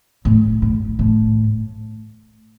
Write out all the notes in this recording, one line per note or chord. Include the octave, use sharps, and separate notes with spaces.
A2
A2
A2